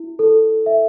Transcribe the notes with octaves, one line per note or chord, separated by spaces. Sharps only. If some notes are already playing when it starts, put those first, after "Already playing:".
Already playing: E4
A4
E5